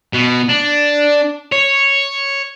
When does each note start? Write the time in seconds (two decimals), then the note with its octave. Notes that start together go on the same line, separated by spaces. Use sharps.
0.13 B2 B3
0.49 D4
1.53 C#5